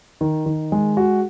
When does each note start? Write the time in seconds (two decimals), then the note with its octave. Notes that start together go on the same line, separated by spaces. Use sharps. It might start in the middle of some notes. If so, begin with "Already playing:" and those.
0.21 D#3
0.46 D#3
0.72 G#3
0.97 F#4